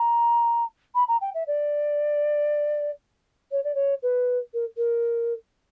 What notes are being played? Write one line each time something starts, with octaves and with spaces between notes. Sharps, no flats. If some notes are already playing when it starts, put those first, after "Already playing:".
Already playing: A#5
B5
A#5
G5
E5
D5
C#5
D5
C#5
B4
A#4
A#4